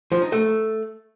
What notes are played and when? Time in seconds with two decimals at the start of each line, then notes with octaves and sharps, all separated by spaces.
0.12 F3
0.22 D#4
0.32 A3